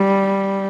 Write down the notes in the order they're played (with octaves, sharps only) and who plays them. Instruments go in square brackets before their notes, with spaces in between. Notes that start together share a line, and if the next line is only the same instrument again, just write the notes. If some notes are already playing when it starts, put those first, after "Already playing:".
Already playing: [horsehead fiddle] G3